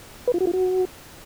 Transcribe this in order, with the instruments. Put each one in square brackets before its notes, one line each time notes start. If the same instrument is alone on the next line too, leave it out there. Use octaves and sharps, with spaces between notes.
[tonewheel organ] B4
F4
F#4
F4
F#4